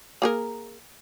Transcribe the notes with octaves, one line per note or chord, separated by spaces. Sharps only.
A#3 G#4 A#4